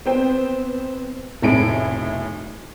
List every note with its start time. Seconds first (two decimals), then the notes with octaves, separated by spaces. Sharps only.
0.06 B3 C4 C5 G5
1.42 F1 B1 A2 G#4 D7